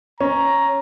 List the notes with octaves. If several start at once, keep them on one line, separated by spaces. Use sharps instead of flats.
C#4 A#5